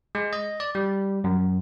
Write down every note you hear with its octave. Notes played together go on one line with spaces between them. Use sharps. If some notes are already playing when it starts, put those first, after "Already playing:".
G#3
D#5
D5
G3
F#2